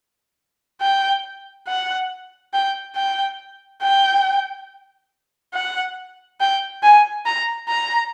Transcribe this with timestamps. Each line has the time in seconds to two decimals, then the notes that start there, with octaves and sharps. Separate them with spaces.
0.82 G5
1.68 F#5
2.54 G5
2.96 G5
3.83 G5
5.54 F#5
6.41 G5
6.83 G#5
7.26 A#5
7.69 A#5